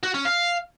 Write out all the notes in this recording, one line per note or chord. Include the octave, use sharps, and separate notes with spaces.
F#4
C#4
F5